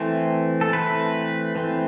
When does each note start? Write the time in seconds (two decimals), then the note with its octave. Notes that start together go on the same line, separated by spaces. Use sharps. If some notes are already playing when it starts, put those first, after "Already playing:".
Already playing: E3 A3 C4
0.61 A4
0.73 E3 A3 C4 B4
1.55 E3 A3 C4